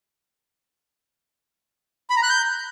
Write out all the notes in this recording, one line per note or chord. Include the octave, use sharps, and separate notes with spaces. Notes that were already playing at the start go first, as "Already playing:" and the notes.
B5
A#5
F#6
G6